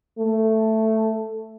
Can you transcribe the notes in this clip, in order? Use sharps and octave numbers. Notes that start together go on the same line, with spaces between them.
A3